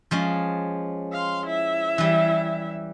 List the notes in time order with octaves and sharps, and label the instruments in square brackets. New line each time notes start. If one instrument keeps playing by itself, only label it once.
[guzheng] F3 G#3 C#4
[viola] F5 C6
E4 E5
[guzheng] E3 G3